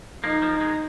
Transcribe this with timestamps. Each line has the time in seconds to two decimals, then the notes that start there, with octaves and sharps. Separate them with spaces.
0.24 F3 A#3 D#4
0.42 F3 A#3
0.60 D#3 G#3